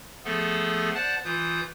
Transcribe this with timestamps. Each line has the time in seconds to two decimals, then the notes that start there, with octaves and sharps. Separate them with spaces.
0.25 F3 A3 B3 G#4 A4
0.94 C5 D5 F#5 A5 F#6
1.25 E3 F4 D#6 G6